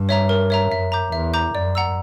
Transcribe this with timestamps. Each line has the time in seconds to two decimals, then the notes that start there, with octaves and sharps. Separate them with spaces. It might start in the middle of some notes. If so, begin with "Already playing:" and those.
Already playing: G2
0.09 C#5 E5 A#5
0.29 A#4
0.50 C#5 E5 A#5
0.71 F#2 E5
0.92 A#5 D6 G6
1.12 E2 E5
1.34 A#5 D6 G6
1.54 F#2 D5
1.75 F#5 A#5 E6